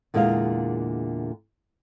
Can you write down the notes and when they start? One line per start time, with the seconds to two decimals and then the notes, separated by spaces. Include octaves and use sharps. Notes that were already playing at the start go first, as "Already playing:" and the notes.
0.14 E2 A#2 D3 G#3 A#3 F5